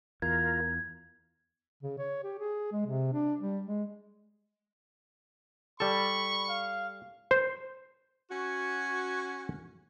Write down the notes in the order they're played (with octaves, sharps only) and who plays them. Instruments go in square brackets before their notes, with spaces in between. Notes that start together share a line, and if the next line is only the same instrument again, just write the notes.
[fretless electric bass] E2 [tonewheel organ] F4 A#4 [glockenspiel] G#6
[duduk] C#3
C#5
G4
G#4
G#3
C3
D4
G3
G#3
[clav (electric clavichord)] G3 A4 [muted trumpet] B5 [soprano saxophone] C#6
[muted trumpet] F5
[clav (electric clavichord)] C5
[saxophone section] C#4 F#4